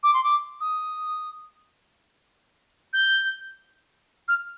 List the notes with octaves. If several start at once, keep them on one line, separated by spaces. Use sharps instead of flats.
D6
C6
D6
D#6
G6
F6